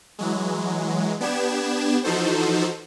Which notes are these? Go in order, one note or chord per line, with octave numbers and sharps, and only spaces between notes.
E3 F#3 G#3
B3 D4 G4 G#6 E7
E3 F3 D#4 F#4 A4 C5